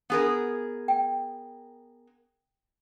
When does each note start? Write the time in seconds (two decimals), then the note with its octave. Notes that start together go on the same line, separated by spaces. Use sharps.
0.10 B3 G#4 A#4
0.88 G5